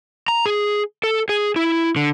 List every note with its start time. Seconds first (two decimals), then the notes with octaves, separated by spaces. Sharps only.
0.28 A#5
0.46 G#4
1.04 A4
1.29 G#4
1.56 E4
1.96 D3